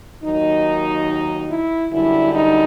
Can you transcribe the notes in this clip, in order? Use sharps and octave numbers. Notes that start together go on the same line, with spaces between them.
D#2 D#3 F#3 D#4
E4
F#2 D3 G3 E4
D#4